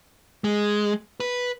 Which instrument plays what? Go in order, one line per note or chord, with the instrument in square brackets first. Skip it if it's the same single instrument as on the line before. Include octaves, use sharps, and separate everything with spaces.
[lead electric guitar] G#3
B4